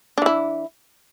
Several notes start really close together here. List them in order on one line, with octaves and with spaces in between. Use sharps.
D4 E3 E4